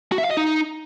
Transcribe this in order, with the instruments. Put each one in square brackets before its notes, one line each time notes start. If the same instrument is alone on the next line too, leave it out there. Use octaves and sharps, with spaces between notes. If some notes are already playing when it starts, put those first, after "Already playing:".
[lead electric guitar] F#4
E5
F5
D#5
D#4